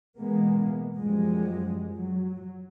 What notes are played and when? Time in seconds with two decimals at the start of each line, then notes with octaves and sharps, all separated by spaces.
0.17 B2 E3 G#3 A#3 B3
0.97 F#2 F3 G3 G#3
1.95 F#3